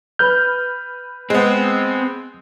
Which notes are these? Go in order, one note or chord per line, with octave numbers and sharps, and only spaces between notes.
B4 F6 G6
G#3 B3 C4